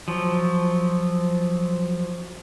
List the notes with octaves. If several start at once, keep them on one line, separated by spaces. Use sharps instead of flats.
F3 F#3